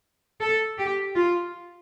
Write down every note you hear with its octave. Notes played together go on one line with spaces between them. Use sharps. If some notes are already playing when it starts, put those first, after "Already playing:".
A4
G4
F4